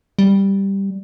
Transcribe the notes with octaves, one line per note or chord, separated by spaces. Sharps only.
G3